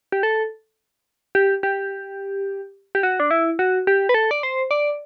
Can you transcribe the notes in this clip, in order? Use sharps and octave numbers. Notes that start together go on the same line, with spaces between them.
G4
A4
G4
G4
G4
F#4
D4
E4
F#4
G4
B4
A4
D5
C5
D5